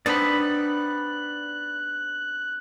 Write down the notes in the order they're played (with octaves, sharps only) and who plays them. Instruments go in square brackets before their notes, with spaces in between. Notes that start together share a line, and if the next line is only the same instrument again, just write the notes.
[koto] B3 C4 D#4 [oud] D4 [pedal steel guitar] D5 B5 [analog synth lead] F#6